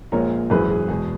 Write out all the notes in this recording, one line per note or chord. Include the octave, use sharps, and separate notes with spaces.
A#1 A#2 G#3 A#4 C#5
G#1 F#2 E3 G#3 G#4 B4
G#4
E2 B2 G#3 G#4